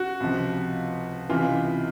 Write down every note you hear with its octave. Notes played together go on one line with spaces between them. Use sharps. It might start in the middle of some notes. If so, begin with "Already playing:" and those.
Already playing: F#4
C#2 C3 F3
C#2 C3 E3 F4